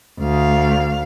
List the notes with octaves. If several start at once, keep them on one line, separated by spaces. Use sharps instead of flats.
D2 F5